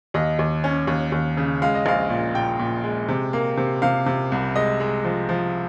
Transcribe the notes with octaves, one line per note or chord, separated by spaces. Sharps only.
D#2 D#5
D#2
C#4
D#2
D#2
C#3
G#3 F5
D#5
A#1 F5
A#2
A#2 G5
A#2
G#3
C3
A#3
C3
C3 F5
C3
C2
G#3 D#5
G#3
F3
F3